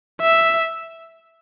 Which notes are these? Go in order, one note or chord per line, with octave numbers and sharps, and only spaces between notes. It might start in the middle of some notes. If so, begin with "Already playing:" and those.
E5